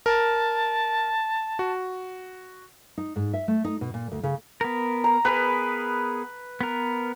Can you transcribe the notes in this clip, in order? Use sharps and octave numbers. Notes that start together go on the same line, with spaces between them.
A#4 A5
F#4
D#4
G#2
E5
A3
D#4
B2
A#2
D2
C#3
B3 A#4
A#5
B3 G#4 A#4 B4
B3 A#4